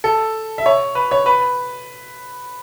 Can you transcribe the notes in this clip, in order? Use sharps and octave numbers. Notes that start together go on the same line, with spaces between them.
A4
E5
C#5
B4
C#5
B4